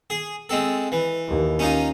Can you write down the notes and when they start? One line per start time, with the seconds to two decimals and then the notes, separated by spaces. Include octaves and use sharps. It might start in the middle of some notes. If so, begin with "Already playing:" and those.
0.10 G#4
0.49 G#3 C4 A4
0.92 E3
1.28 D#2
1.59 C#4 D#4 F4